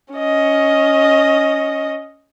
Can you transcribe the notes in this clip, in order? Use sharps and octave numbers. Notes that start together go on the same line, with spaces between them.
C#4 D#5